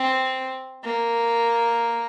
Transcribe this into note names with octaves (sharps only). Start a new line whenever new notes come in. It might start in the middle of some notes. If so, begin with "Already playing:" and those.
Already playing: C4
A#3